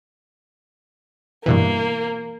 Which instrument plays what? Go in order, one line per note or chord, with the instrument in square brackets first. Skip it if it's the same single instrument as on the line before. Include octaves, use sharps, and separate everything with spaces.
[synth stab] G2 B2 E3 [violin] A#3